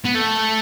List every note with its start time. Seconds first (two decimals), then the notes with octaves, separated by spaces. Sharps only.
0.05 B3
0.15 A3